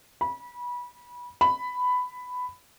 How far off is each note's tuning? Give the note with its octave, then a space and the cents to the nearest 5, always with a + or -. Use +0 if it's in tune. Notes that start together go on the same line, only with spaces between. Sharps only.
B5 -25
B5 +10